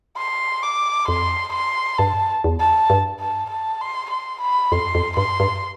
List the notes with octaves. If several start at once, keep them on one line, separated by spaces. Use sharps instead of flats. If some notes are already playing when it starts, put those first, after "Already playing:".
C6
D6
F2 C6
C6
G2 A5
E2
A5
G2
A5
A5
C6
C6
B5
F2 C6
F2
G2 C6
G2